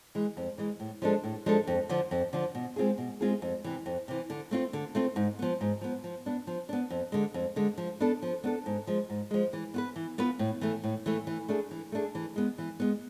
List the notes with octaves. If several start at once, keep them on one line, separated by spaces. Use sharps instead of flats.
E3 G#3
F2
E3 G#3
A2
F3 G#3 D4 A4
A2
F3 G#3 D4 A4
F2
D3 F3
F2
D3 F3
B2
G#3 C4 F4 G#4
B2
G#3 C4 F4 G#4
F2
C3 E3
F2
C3 E3
D3
A3 C4 F4
D3
A3 C4 F4
G#2
F3 B3
G#2
F3 B3
F3
B3 D4
F3
B3 D4
F2
D3 G#3
F2
D3 G#3
F3
B3 D4 A4
F3
B3 D4 A4
G#2
F3 G#3
G#2
F3 G#3
E3
B3 F4 B4
E3
B3 F4 B4
A2
E3 A3
A2
E3 A3
E3
A3 D4 G#4
E3
A3 D4 G#4
E3
G#3 B3
E3
G#3 B3